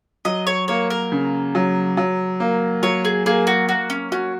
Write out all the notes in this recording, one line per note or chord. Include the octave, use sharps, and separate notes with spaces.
F#3 D#5
C#5
A#3 C#5
A#4
C#3
F#3
F#3
A#3
F#3 C#5
G#4
A#3 G#4
F#4
A#3 F#4
C#4
C#4 F#4